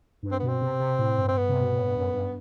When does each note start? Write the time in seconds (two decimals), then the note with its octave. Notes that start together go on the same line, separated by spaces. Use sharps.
0.23 G2
0.32 C4
0.40 B2 B3
0.48 C4
0.61 C3
0.80 C3
0.99 A2
1.18 G2
1.28 C4
1.37 B3
1.49 C3
1.61 B2
1.73 A2
1.84 G2
1.95 F#2
2.14 G2